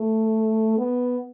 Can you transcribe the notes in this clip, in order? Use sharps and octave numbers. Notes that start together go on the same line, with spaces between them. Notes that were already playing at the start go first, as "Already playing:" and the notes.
Already playing: A3
B3